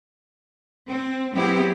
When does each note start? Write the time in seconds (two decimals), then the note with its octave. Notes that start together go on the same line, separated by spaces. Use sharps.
0.87 C4
1.33 F#3 B3 C4 E4 G4 G#4